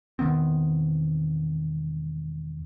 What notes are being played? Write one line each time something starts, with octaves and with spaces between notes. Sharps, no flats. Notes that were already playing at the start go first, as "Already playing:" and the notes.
E1 D#3 B3 C4